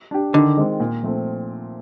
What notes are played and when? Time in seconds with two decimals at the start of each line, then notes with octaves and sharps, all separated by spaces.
0.11 D4 G4
0.34 D3 D#3
0.57 G#3 C4
0.80 A#2
1.02 F3 A3 C4